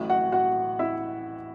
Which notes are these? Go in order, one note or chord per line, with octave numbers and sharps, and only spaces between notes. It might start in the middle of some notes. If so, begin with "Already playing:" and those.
Already playing: A1 A2 F#3
F#4 F#5
F#4 F#5
E4 E5